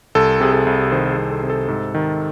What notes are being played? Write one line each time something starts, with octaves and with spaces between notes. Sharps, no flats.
C2 A4
C3 G#4
A4
C2
D#3 C5
G#4
C2
A4
C3
A4
G#2
D#3